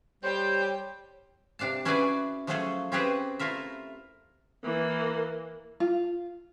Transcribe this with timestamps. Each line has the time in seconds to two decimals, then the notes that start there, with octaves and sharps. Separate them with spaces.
0.23 G3 G4 C5 C#5 G5
1.59 C3 D4 F5 A5
1.85 C#4 E4 F#4 G#4 B4 D5
2.47 F3 F#3 A3 C#4 G#4 A4
2.92 C4 C#4 G4 G#4 B4 C5
3.39 A3 E4 F4 A#4 E5
4.64 E3 A#3
5.80 F4